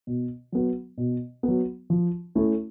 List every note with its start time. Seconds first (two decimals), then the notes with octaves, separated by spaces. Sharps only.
0.07 B2
0.52 F#3 B3
0.98 B2
1.43 F#3 B3
1.90 F3
2.35 A3 C#4 E4